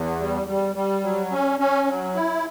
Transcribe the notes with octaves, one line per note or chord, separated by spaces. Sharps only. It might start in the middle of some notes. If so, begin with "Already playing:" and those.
Already playing: E2
G3
G3
G3
F#3
C#4
C#4
F#3
E4